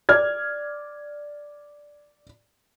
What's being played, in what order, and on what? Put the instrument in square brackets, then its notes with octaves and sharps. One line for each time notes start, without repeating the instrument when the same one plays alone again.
[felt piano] D5 F6 G#6